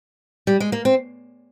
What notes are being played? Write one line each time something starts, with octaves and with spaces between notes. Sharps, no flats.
G3
G#3
A#3
C4